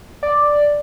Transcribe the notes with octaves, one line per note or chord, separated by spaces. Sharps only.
D5